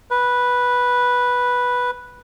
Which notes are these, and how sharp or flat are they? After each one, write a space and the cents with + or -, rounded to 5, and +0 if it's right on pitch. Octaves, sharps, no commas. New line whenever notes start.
B4 -5